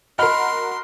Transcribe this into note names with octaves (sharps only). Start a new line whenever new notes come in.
F#4 A#4 D#5 B5 C6 F6